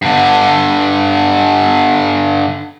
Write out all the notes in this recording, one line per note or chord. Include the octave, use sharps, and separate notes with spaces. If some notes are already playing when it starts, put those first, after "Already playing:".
G2 D3